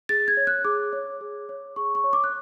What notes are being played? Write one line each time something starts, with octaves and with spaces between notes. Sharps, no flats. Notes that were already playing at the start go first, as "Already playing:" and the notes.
G#4 A6
G#6
C#5
F#6
G#4 D6
C#5
G#4
C#5
G#4 C#6
C#6
C#5
D6
F#6